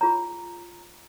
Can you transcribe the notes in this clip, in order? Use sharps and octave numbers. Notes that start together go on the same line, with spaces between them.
F4 G#4 C#5 A#5